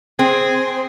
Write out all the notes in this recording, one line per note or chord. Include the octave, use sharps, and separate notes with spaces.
C4 G#4